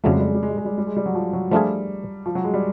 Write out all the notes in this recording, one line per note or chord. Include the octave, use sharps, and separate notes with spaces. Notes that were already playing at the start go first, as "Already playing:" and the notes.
F2 C#3 F#3 G3 A3
G#3
G3
G#3
G3
G#3
G3
G#3
G3
G3
G#3
G3
F#3
F3
F#3
F3 G3 A3 D4 F4 G#4
F3
F#3
G#3
G3